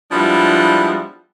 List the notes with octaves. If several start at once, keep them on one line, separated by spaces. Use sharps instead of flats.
F3 G3 G#3 B3 D4 E4